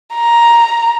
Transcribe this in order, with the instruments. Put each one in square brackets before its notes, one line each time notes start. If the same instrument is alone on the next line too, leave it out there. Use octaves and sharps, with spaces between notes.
[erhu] A#5